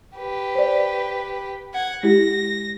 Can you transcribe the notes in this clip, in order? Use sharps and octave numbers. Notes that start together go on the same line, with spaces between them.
G4 B4
C5 D5
F#5 G#6
G#3 E4 G4 A#6